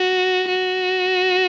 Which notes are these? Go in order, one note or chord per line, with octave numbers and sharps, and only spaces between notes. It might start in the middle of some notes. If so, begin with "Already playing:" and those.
Already playing: F#4
F#4